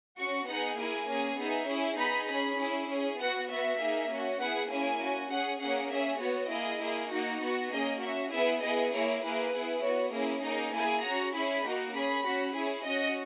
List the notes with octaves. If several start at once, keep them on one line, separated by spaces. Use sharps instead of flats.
C#4 F#4 C#6
B3 D#4 G#4 F#5
A#3 E4 G#4 G#5
A#3 C#4 G#4
B3 D#4 G#4 E5
C#4 E4 G#4
B3 D#4 G#4 B5
C#4 G#4 B5
C#4 E4 G#4
C#4 G#4
B3 F#4 F#5
B3 F#4 E5
A#3 D#4 G#4
C#4 F#4
B3 E4 G#4 F#5
A#3 C#4 E4 G#4 G#5
C#4 F#4
C#4 G#4 F#5
A#3 C#4 G#4 F#5
C#4 G#4 E5
B3 F#4 C#5
A#3 E4 G#4 D#5
A#3 E4 G#4
A#3 D#4 F#4
B3 F#4
A#3 C#4 G#4 D#5
C#4 F#4 E5
B3 E4 G#4 E5
B3 E4 G#4 D#5
A#3 E4 G#4 C#5
A#3 E4 G#4 B4
B3 E4 G#4
B3 F#4 C#5
A#3 C#4 E4 G#4
A#3 D#4 G#4
A#3 E4 G#4 G#5
C#4 F#4 A#5
C#4 E4 G#4 B5
A#3 D#4 F#4
C#4 G#4 B5
C#4 F#4
C#4 E4 G#4
C#4 F#4 D#5